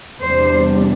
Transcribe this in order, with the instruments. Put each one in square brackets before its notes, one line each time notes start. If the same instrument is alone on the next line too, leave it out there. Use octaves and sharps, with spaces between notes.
[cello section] E2 C3 G3 D4 C5